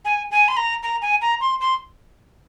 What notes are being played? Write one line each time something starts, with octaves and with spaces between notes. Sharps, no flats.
G#5
G#5
C6
A#5
A#5
G#5
A#5
C6
C6